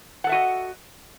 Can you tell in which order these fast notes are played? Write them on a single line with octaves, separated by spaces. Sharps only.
F#5 A4 E5 F#4 D#5